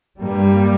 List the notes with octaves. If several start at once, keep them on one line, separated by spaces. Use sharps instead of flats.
G2 G3 A#3